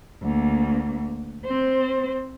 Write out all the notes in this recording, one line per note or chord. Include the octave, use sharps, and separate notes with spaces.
D2 A#3
C4 C5